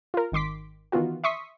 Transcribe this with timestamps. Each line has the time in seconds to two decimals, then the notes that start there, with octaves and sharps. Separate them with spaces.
0.14 F4 A#4
0.32 G#1 D#3 C6 D6 B6
0.92 D#3 E3 B3 F4 F#4
1.24 E5 C6 C#6 D#6 B6